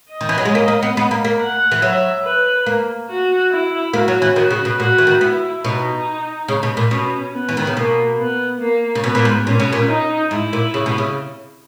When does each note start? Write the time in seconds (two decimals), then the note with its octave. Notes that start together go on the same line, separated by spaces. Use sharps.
0.12 D#5
0.21 D#3
0.29 E3
0.38 F#3
0.45 G#3
0.55 A#3
0.68 A#3
0.83 B3
0.97 B3
1.11 A#3
1.25 A#3
1.40 F#5
1.72 E3
1.82 F#3 E5
2.24 B4
2.66 A#3
3.10 F#4
3.51 E4
3.93 A#3 F#4
4.08 F#3
4.22 E3
4.36 D#3 F#4
4.51 C#3
4.65 B2
4.79 A#2 F#4
4.98 E3
5.07 D#3
5.21 B3 E4
5.64 B2 D#4
6.48 C#3
6.63 B2
6.77 A#2
6.91 B2 C#4
7.34 B3
7.49 E3
7.57 D#3
7.67 C#3
7.77 B2 A#3
8.19 B3
8.61 A#3
8.95 C#3
9.04 B2 B3
9.15 A#2
9.25 G#2
9.46 A#2 C#4
9.60 B2
9.73 A#2
9.88 D#4
10.31 G#2 E4
10.53 A#2
10.74 C#3
10.86 B2
10.98 C#3